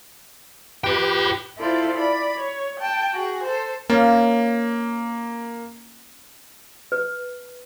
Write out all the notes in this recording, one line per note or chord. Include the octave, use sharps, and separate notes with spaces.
F4 G4 B4 G5
E4 F4 A4 C5 D5
D5 B5
C#5
G5 A5
F#4 G#4
A4 C5
A#3 C#4 F4 D5
B4